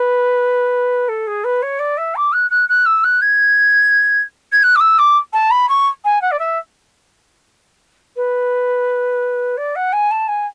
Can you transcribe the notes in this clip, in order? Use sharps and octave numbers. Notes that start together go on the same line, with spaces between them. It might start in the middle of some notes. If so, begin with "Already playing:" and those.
Already playing: B4
A4
G#4
B4
C#5
D5
E5
D6
F#6
F#6
F#6
E6
F#6
G#6
G#6
F#6
D6
E6
D6
A5
B5
C#6
G#5
F#5
D5
E5
B4
D5
F#5
G#5
A5
G#5